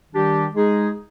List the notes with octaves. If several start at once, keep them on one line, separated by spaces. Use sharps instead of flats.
D#3 G3 D4 G4
G#3 D#4 G#4